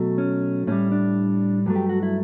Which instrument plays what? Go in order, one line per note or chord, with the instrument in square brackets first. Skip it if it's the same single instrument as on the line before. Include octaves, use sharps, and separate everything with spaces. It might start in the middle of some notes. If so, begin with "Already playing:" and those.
Already playing: [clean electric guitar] B2 F#3 A3
C#4
A2 G3 C#4
D4
G2 F#3 A3
G4
F#4
E4